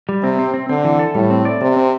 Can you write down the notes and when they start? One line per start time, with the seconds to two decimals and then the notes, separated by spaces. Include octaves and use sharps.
0.09 G3
0.23 C3 C4
0.39 C4
0.54 C4
0.69 D3 C4
0.85 E3
0.99 A4
1.15 A2 G3
1.30 C4
1.45 D5
1.61 C3 C4
1.76 C4